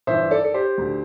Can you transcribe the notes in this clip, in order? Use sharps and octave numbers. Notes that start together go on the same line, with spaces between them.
G1 G2 E3 C5 E5
A4 D5
A4
G4 C5
D2 D3